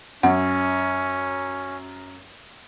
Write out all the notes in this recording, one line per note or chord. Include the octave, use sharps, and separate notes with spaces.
F#2 C#4 F#5